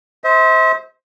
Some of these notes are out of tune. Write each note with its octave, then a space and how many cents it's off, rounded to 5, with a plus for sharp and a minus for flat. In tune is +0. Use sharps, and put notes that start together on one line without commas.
C5 +0 E5 -45